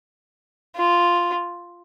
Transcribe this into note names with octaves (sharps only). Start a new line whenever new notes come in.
F4